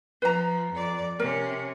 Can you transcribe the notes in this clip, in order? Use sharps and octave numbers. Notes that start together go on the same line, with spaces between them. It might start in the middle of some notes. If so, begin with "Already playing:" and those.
F3 B4 A#5
F2 D5
C3 C#4 A#4